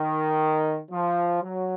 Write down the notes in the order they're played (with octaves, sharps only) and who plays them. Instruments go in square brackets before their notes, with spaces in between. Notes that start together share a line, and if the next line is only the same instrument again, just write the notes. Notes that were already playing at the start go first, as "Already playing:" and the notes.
Already playing: [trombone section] D#3
F3
F#3